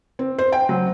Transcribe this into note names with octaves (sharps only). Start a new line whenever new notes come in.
C4
C5
G5
F#3